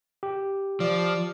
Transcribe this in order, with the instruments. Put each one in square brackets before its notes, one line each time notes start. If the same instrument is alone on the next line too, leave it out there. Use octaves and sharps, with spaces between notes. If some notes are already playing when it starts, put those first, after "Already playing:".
[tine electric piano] G4
[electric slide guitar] F3 [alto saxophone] D5